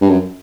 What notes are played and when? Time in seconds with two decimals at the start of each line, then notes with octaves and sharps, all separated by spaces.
0.01 G2
0.10 F#2